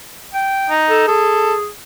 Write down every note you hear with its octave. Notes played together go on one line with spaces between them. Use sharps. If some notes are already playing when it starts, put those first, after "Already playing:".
G5
D#4
A4
G#4 A4